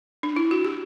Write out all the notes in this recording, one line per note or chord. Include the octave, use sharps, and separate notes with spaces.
D4
E4
F#4
G4